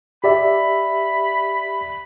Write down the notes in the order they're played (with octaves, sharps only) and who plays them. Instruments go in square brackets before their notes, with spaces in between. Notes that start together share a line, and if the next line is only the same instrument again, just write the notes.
[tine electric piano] G4 D5 E5 [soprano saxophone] B5